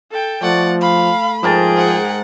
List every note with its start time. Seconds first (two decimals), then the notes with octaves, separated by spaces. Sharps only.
0.11 A4 G5
0.43 F3 A3 D5 F#5
0.81 F5 B5
1.43 G#2 F3 G#4 A#4 G5 A5
1.77 F#5